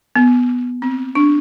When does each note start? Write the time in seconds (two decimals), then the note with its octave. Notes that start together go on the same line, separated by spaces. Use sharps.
0.16 B3
0.82 C4
1.15 D4